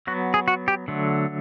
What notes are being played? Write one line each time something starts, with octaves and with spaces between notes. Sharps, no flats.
F#3 B3 F#4
G#4
F#4
G4
D3 F#3 A3